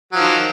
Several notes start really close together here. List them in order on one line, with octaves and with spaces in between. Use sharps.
F#3 F3 D#3